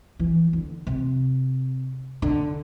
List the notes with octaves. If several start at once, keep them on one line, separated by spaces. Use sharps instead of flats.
E3
D3
C3
D3